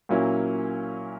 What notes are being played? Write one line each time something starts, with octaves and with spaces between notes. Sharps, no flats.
A#2 F#3 A#3 C#4 E4